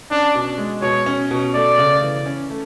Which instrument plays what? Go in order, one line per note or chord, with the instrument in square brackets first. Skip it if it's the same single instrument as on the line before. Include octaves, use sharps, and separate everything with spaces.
[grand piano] C#4 [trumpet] D4
[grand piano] B2
G#3
[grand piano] B2 [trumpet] C#5
[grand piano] C#4
B2
[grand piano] A3 [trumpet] D5
[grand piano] C#3
E3
C#4
A3